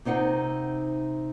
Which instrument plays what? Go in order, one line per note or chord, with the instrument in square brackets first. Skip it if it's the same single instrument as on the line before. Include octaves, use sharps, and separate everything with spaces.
[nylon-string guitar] C3 C4 D#4 F#5 G5